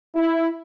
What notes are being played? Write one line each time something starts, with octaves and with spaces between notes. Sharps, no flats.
E4